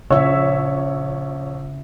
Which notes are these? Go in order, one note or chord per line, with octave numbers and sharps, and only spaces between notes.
A#1 C#3 C#5 E5 E6